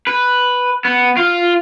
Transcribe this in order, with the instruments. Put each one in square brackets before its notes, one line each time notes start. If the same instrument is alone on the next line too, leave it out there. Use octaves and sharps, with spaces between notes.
[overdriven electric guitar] B4
B3
F4